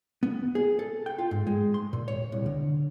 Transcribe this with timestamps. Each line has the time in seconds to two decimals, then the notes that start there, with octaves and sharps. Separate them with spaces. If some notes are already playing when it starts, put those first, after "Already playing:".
0.23 B3
0.55 G#4
0.79 A4
1.06 G5
1.18 F4
1.31 G#2
1.47 G#3
1.74 C6
1.93 A#2
2.08 C#5
2.32 C2
2.46 D3